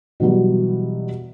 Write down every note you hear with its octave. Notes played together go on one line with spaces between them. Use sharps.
B2 E3 F#3 G3